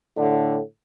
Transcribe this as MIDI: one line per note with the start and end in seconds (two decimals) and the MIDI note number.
0.17 0.58 45
0.17 0.58 50